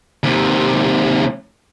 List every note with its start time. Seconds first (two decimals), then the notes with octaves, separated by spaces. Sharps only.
0.24 D#2 C3